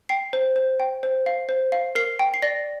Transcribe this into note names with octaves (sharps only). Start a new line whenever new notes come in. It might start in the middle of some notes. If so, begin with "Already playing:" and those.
G5 C7
C5
C5
G5
C5
F5
C5
F5
A#4 C7
G5
C7
D5 A#6